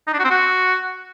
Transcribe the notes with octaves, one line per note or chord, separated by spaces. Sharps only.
D#4
D4
F#4
C4
F#4